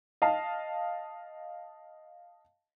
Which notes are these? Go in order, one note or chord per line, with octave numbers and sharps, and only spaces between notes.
D#5 F5 A5